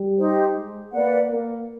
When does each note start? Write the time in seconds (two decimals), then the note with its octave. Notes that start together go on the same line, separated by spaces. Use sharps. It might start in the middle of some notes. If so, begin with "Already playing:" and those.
Already playing: G3
0.18 D#4 G4 C5
0.56 G#3
0.93 A#3 B4 D5 F#5
1.31 A#3